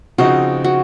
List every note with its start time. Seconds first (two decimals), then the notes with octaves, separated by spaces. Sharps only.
0.18 C#3 F3 C4 D#4 F#4
0.64 F#4